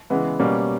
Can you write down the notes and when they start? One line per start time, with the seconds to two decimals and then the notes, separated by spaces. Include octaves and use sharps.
0.10 C#3 E3 G#3 B3 E4
0.39 B2 G3 A#3 C#4